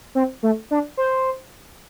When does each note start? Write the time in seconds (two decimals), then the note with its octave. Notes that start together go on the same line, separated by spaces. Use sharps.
0.15 C4
0.43 A3
0.71 D4
0.97 C5